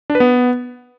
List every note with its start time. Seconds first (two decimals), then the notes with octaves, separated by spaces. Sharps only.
0.10 D4
0.15 B4
0.20 B3